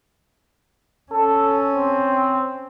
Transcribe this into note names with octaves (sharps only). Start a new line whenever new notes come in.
C#4 A4
C4